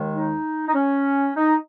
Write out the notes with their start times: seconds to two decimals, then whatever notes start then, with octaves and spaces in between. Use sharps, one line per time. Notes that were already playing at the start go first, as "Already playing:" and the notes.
Already playing: D#2 D#3 G#3
0.13 D#4
0.67 D#4
0.73 C#4
1.36 D#4